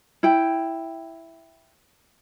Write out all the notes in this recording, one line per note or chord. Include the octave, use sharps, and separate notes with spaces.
E4 G5